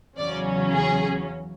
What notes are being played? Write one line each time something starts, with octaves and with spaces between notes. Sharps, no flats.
E2 C#3 F#3 C#4 D5
G#4